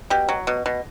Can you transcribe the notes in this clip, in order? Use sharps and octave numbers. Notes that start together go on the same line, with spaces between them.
B2 G4
F#3
B2
B2